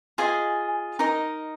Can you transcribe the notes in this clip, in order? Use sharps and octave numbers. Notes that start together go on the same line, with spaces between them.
F4 G#4 D#5 G#5
D#4 A#4 D#5